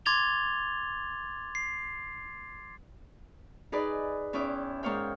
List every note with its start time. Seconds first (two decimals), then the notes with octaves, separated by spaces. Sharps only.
0.06 C6 D6 G#6 A6 F7 G7
1.55 C7
3.72 D#4 G#4 B4 D5
4.33 E2 C#4 E4 G5 D6
4.83 G#2 A#3 C#5 F5 G5